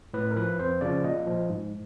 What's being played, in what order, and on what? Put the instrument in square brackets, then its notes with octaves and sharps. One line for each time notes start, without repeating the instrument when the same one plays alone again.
[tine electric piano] A2 B4
A#4
F3 B4
F2 C5
C#3 F3 D5
A#2 D#5
F3
G#2